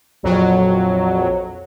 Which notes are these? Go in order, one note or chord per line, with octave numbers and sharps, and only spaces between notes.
A#1 F2 F#3